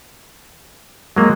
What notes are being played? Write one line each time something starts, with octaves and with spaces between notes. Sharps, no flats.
F#3 G#3 A#3